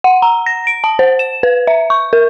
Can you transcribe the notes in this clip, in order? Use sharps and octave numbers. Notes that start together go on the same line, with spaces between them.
F#5
A#5
A#6
D7
A5
C5
E7
B4
E5
C#6
A#4